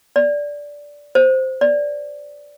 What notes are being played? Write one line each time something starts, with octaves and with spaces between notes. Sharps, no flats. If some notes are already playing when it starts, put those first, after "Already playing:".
D5
C5
D5